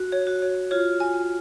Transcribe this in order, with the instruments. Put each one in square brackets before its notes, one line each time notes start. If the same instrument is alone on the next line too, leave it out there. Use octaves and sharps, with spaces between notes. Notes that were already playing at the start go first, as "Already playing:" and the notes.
Already playing: [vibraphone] F#4
[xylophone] C#5
[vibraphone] F#4
[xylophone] C#5
[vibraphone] F4 [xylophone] C#5
[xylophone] G#5